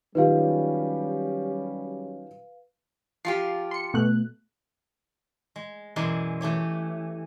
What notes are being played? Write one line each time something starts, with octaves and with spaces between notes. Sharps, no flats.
D#3 F#3 G3 C#4 F4 G4 B4 F5
F3 F4 G4 C7
C6 C#7
B2 A3 F#6
G#3
F#2 B2 E3 G#3 D5 C6
E3 A3 G4 C#5